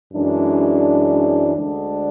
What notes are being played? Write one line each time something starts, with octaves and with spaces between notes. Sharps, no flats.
F#2 E3 G#3 D4
D2 D3 G#3 D4